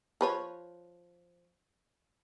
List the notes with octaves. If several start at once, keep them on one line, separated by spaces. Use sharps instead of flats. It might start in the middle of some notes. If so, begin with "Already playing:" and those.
F3 B4 C#5